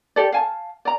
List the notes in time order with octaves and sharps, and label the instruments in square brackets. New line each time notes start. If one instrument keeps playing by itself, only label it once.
[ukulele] G4 A4 D5
F5 G#5 A5
D5 A#5